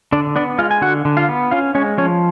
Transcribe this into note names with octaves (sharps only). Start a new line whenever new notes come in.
D3 D4 D5
B3 D4 D5
G#3 F4 F5
G#5
D3 F#4 F#5
D3
F4 F5
B3
C#4 F4 F5
G#3 C#4 C#5
F3 C#4 C#5